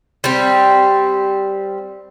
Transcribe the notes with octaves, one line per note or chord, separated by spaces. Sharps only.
G3 C4